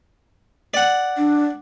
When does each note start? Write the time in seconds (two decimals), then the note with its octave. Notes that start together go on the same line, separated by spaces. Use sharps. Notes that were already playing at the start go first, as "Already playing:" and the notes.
0.74 D5 F#5
1.17 D4